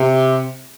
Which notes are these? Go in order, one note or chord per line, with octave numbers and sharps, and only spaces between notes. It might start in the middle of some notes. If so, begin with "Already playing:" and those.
Already playing: C3